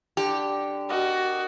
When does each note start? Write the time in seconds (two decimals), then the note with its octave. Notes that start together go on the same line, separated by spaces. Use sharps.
0.17 D3 G4
0.89 F#4 A#4 D5 D#5